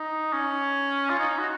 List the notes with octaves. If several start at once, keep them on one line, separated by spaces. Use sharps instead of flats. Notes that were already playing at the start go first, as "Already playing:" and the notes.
Already playing: D#4
C#4
F4
D#4
F#4